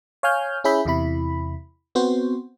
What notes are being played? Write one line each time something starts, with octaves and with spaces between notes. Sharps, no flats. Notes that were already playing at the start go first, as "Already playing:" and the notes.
C#5 F5 G#5 F6 G6
C#4 E4 G#4 E5 B5 G6
E2 C3 E4 B5
B3 C4 F#4 C5